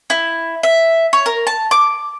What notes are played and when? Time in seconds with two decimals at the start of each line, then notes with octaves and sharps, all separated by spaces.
0.10 E4
0.63 E5
1.13 C#5
1.26 A#4
1.47 A5
1.71 D6